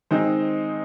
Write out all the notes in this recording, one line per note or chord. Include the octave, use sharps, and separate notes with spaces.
D#3 G#3 C4 D#4 C5